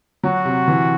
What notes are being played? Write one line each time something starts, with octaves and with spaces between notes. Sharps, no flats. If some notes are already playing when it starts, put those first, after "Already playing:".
F#3 F#4
C3
E3